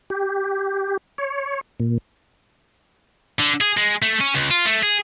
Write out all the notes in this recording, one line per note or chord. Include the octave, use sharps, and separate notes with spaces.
G4
C#5
A#2
D3
G#4
G#3
A3
C#4
C#2
F4
A3
G#4